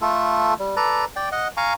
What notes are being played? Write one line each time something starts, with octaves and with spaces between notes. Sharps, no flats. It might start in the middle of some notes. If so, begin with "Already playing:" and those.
A3 F4 A4
G3
A4 B4 D5 A#5
D5 G5
D#5 F#5
F5 G#5 A#5 C#6